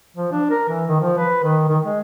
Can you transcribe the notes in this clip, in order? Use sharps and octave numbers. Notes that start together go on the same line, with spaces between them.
F3
D4
A#4
E3
D#3
F3
B4
D#3
D#3
G#3